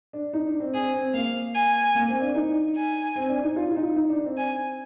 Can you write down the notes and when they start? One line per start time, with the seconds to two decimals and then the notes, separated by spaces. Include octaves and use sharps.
0.13 D4
0.33 D#4
0.47 D4
0.60 C4
0.74 C4 G#4
0.94 C4
1.14 A#3 F5
1.54 G#5
1.95 A#3
2.08 C4
2.21 D4
2.35 D#4
2.76 G#5
3.16 C4
3.29 D4
3.43 D#4
3.56 F4
3.71 F4
3.76 D#4
3.96 D#4
4.10 D4
4.24 C4
4.37 G#5